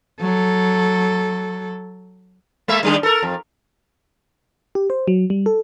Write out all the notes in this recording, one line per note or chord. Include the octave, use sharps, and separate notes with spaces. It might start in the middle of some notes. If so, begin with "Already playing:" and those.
F#3 A4
G#3 A#3 E5
D#3 G3 D4
A4 A#4
F2
G4
C5
F#3
G3
A4